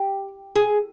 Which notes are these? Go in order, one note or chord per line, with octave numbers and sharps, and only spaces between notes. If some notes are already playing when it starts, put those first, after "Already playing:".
Already playing: G4
G#4